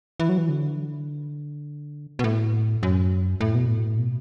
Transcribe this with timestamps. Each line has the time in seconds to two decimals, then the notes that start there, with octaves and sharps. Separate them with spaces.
0.20 E3
0.29 F#3
0.38 E3
0.49 D3
2.19 B2
2.24 A2
2.83 F#2
3.41 A2
3.55 B2
3.68 A2
3.99 B2